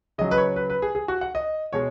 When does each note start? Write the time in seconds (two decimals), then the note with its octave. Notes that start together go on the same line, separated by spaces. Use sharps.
0.18 C#3 F#3 D#5
0.31 B4
0.37 C#5
0.56 B4
0.70 B4
0.82 G#4
0.95 G#4
1.08 F#4
1.21 F#5
1.35 D#5
1.73 B2 G#3 C#5